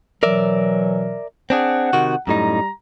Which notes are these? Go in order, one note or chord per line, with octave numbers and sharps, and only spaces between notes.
B2 E3 F#3 A#4 D5 E5
C4 D4 G#4 F#5
C3 D#3 F#4
F#2 A2 G3 D#4 G4 A#5